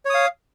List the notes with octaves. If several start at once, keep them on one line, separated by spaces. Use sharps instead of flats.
C#5 F5 D#6